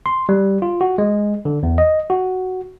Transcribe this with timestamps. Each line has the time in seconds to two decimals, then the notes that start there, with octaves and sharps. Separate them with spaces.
0.06 C6
0.29 G3
0.62 F4
0.81 F#4
0.98 G#3
1.45 D3
1.63 E2
1.78 D#5
2.10 F#4